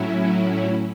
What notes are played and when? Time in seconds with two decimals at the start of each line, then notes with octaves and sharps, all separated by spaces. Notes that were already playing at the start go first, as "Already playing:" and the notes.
Already playing: A2 F#3 C#4 E4